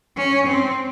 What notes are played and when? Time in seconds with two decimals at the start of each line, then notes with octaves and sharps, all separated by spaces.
0.17 C#4
0.48 C4